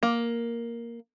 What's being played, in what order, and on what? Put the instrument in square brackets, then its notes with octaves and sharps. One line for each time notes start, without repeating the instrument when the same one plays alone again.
[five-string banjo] A#3